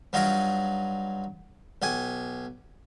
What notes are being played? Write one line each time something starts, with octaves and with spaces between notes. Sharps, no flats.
G2 F#3 D#4 F4 A#5
B1 G4 G#5